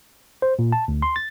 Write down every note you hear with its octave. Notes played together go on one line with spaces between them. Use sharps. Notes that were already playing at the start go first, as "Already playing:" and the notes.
C5
A#2
A5
D2
C6
A6